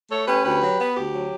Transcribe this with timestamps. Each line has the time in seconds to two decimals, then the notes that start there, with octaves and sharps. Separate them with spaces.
0.10 A3 A4 C#5
0.27 C#4 G4 B4
0.45 D2 G4 B4
0.62 F#3
0.79 B3
0.97 D2 G4
1.14 F#3